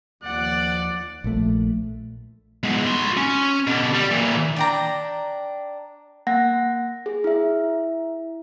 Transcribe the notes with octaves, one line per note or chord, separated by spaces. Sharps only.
D#2 D#3 F3 D5 F#5
A#1 A3
G#3 B3
F#4 C6
C#4
B2 D3
G3
A#2 E3
D4 G5 A#5
A#3 F#5 A#6
G#4
E4 E5